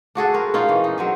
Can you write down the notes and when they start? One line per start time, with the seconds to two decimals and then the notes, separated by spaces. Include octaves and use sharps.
0.15 D4 F#4 G#4 A4
0.34 C4 A#4
0.54 C#4 D#4 F4
0.69 E3
0.84 D#4
0.98 F#3 C4 G#4